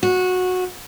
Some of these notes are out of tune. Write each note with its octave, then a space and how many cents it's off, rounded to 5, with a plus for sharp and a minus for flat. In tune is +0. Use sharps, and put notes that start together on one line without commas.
F#4 -15